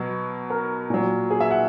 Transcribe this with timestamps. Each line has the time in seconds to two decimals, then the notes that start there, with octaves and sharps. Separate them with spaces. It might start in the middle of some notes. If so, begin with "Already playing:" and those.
Already playing: B2 F#3
0.50 A#4
0.90 A#2 F#3
1.30 G#4
1.40 E5
1.51 F#5